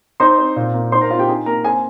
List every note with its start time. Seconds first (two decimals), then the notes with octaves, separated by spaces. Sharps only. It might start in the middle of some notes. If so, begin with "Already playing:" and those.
0.20 D#4 C5 C6
0.38 C4
0.56 A#2
0.74 A#3
0.92 D#4 C5 C6
1.01 A#4 A#5
1.10 C4 F4 F5
1.19 G4 G5
1.28 D#4 G#4 G#5
1.46 A#3 A#4 A#5
1.64 C4 G#4 G#5